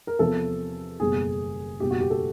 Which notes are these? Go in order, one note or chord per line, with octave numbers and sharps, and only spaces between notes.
A#4
E2 C3 F3 A4
F#1 E2 B2 G3 G#4
F#1 E2 B2 G3 G4
F#4
G4
A4